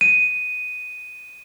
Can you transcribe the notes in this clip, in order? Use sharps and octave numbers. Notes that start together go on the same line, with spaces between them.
D#7